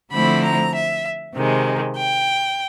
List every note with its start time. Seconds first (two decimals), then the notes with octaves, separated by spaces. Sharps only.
0.12 D3 F3 A3 C4 E4 B5
0.43 A#5
0.74 E5
1.36 C3 D#3 G#3
1.97 G5